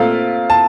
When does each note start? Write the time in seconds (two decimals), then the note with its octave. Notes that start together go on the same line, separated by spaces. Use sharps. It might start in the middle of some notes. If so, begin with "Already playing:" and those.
Already playing: A#2 A3 C4 F4 A4 F5
0.50 A5